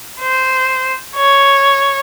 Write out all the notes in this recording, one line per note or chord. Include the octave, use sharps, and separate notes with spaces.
C5
C#5